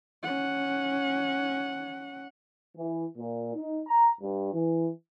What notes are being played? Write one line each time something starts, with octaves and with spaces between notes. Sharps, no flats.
C#4 F#5
E3
A#2
D#4
A#5
G2
E3